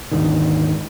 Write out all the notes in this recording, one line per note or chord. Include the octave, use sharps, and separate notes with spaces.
D#2 G#2 D3 D#3